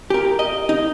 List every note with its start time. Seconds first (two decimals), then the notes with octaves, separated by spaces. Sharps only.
0.10 G4 A#4
0.39 D#5
0.69 D#4